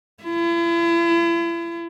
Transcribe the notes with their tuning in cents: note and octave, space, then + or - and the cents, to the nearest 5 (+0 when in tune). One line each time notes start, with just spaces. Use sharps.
E4 +40